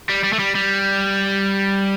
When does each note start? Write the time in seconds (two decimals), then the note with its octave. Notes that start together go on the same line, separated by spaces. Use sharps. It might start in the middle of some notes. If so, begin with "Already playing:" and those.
0.09 G3
0.24 G3
0.33 A3
0.40 G3
0.55 G3